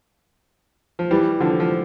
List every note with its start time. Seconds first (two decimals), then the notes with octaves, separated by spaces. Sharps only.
0.99 F3
1.11 E3 G3
1.40 D3 F3
1.60 F3